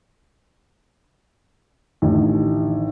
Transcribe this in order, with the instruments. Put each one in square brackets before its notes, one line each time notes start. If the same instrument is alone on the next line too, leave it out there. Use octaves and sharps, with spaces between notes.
[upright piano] A1 D3 D#3